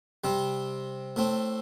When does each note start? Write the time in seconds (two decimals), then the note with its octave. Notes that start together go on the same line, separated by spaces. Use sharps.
0.24 C3 G3 C4
1.16 A2 A3 C4